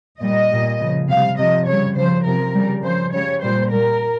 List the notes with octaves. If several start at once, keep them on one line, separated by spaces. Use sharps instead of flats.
A#2 G3 D#5
A#2 G3
C#3 F3
C3 G3 F5
C3 F3 D#5
C#3 G3 C#5
C#3 F3 C5
C3 F3 A#4
C#3 G3
C#3 F3 C5
C#3 G3 C#5
A#2 G3 C5
A#2 G3 A#4